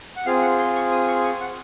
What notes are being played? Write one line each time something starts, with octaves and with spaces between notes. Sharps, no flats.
F#5
C4 F4 G#4 F5
F#5
C6
C#6
D#6
C#6
C#6
F#5